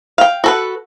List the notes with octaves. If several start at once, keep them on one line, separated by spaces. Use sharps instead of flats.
F5 G5
F#4 A4 B4